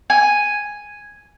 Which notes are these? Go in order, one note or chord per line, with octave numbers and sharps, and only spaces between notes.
G#5